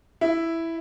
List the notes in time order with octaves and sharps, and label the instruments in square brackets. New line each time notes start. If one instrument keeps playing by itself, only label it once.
[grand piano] E4